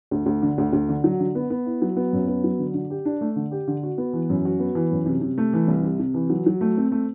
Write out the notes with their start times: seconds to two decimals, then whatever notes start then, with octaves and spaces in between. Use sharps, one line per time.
0.11 D2
0.26 D2
0.42 D3
0.58 D2
0.73 D2
0.89 D3
1.04 F#3
1.20 D3
1.35 B3
1.50 B3
1.66 E4
1.82 F#3
1.97 B3
2.13 F#2
2.28 B3
2.44 F#3
2.59 D3
2.74 D3
2.90 G4
3.05 D4
3.21 A3
3.36 D3
3.51 G4
3.68 D3
3.83 F#4
3.98 B3
4.13 E3
4.30 F#2
4.45 F#4
4.59 B3
4.75 E3
4.91 F#2
5.06 C3
5.21 C3
5.38 A3
5.53 E3
5.68 C2
5.84 C3
5.99 C3
6.14 E3
6.30 F#3
6.46 F#3
6.61 A3
6.77 C4
6.92 A3